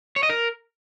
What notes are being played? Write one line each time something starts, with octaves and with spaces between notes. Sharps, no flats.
C#5
D#5
A#4